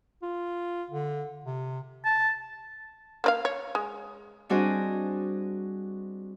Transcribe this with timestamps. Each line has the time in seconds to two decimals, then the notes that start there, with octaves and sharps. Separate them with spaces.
0.22 F4
0.90 D3
1.45 C3
2.05 A5
3.24 A#3 D5 F5
3.45 C#5
3.75 G#3
4.49 G3 C4 D4 F#4 G#4 D#5